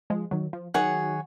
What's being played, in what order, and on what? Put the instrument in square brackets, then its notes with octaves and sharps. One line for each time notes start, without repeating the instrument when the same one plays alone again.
[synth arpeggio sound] F3 G#3
D#3 F#3
F3
[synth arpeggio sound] D#3 F#3 [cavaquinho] G#4 C#5 F#5